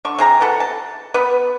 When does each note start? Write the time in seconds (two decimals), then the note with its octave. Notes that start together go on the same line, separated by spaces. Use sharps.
0.05 D3 C#6
0.18 C3 G#4 A#5
0.40 E3 B3 A4 F#5
0.60 A5
1.14 B3 B4